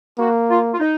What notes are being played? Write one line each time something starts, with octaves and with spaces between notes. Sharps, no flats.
A#3 F#4
F4
F4
D#4